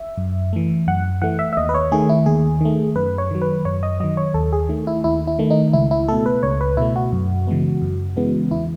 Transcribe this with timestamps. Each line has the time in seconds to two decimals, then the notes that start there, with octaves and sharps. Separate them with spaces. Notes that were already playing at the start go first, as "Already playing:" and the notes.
Already playing: E5
0.17 F#2
0.53 E3 A3
0.87 F#2 F#5
1.22 E3 A3 F#5
1.39 E5
1.53 E5
1.57 D#2 D#5
1.69 B4
1.75 C#5
1.91 D#3 A3 G#4
2.09 E4
2.26 D#2 G#4
2.61 D#3 A3
2.96 F#2 B4
3.18 C#5
3.31 D#3 F#3
3.42 B4
3.65 F#2 C#5
3.83 D#5
4.00 D#3 F#3 D#5
4.17 C#5
4.34 D#2 A4
4.53 G#4
4.69 D#3 A3
4.87 E4
5.04 D#2 E4
5.27 E4
5.39 D#3 A3
5.50 D#4
5.73 C#2 E4
5.91 E4
6.08 B2 A3 A4
6.26 B4
6.43 C#2 C#5
6.61 B4
6.77 B2 A3 E4
6.96 F#4
7.12 F#2
7.47 C#3 E3 G#3 B3
7.82 F#2
8.17 C#3 E3 G#3 B3
8.51 E2 E4